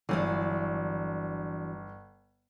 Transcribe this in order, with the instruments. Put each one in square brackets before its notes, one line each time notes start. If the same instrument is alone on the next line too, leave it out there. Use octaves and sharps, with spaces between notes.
[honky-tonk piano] G1 [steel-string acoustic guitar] E3 F#3 D4